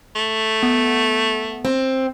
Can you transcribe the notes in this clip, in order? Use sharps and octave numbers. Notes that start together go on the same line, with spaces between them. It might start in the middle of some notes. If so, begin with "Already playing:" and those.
A3
B3
C4